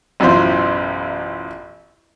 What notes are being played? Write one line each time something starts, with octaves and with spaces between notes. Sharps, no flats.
A1 F#2 B2 E4 F4 C5